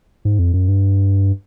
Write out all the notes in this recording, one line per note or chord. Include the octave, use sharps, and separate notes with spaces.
G#2
F2
F#2
G2